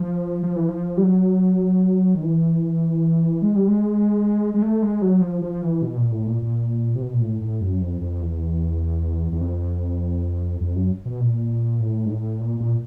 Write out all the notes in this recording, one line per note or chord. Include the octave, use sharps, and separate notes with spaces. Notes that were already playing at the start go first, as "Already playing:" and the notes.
Already playing: F3
F3
E3
F3
G3
F#3
D#3
E3
G#3
G3
G#3
G#3
A3
G#3
F#3
F3
F3
E3
B2
A#2
A2
A#2
A#2
C3
B2
A#2
A2
A2
F#2
F2
F2
E2
E2
F2
F2
F#2
B2
A#2
A2
G#2
A2
A#2
A#2